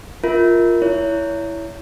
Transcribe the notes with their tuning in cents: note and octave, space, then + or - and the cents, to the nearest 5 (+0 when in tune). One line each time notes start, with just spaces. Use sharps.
F4 +0 A#4 +0 E5 -30
E4 +5 C#5 +25